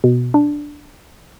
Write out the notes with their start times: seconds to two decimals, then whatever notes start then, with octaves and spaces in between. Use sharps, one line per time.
0.04 B2
0.34 D4